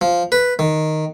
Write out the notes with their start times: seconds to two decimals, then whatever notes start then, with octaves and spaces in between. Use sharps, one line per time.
0.01 F3
0.32 B4
0.59 D#3